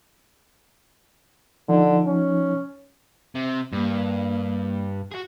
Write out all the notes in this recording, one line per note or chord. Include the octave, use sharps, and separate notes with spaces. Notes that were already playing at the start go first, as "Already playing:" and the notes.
D3 F3 D#4
C#4
C3
G2 A#3
F#4 G#4